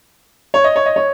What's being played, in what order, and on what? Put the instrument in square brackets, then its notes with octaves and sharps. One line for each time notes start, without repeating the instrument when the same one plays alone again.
[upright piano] C#5
D#5
C#5
D#5
C#5